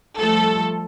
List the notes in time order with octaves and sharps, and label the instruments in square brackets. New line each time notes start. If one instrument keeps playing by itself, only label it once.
[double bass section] F3 G3 A3 [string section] A4